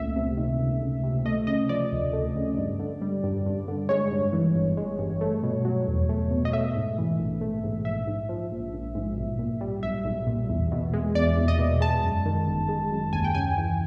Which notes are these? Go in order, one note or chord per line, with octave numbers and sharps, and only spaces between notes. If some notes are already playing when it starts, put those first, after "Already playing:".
Already playing: C#2 A#2 A3 E5
C3
D#3
C#2
C#2
C3
A3 D#5
C#3 D#5
F3 D5
D2
A3
C#3
G2
D3
G3
G2
G2
D3
G#3 C#5
G2
E3
G1
G#3
G2
A3
B2
F#3
E2
A3
B2
D#5
A3 E5
G#2
E3
A#1
A3
G#2
A#1 E5
G#2
F3
A#1
A#1
G#2
B1
A#2
G3
B1 E5
B1
A#2
E2
B2
G#3
E2 D5
E2
D#5
B2
G#3 A5
F#2
D#3
G1
G#3
F#2
D#2 G#5
G5
C#3 G#5
E3